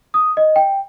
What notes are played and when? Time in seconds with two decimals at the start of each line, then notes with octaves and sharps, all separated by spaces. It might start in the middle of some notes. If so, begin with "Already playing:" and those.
0.14 D#6
0.37 D#5
0.56 G5